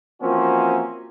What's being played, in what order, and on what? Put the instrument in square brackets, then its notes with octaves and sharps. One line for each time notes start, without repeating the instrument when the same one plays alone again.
[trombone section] E3 F3 A#3 C4 C#4 F#4